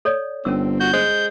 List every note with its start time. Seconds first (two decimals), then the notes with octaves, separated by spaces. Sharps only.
0.05 A4 C#5 D5
0.45 G1 C4 C#4 A#4 E6
0.80 F#4 G6
0.93 G#3 C5